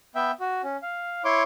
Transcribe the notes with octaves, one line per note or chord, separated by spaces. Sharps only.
B3 E5 G5
F#4
C#4
F5
E4 C#5 C6 D6